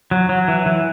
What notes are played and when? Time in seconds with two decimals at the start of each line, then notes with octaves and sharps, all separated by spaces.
0.11 F#3
0.29 F#3
0.48 E3
0.66 E3